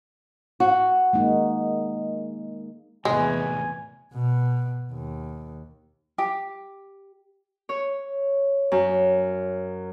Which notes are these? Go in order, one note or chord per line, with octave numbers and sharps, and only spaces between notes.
F#4
G#3 A#3 D#4
E2 A2 C3 G#3 G#5
B2
D#2
G4
C#5
F#2